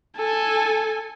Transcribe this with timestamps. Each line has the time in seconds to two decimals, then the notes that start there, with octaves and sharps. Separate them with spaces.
0.16 A4 G#5